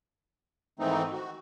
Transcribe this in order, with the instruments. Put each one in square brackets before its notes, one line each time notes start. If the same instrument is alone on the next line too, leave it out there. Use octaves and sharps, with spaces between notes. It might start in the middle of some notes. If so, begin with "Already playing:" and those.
[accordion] G#2 D#3 E3 A3 C4 D#4
F#4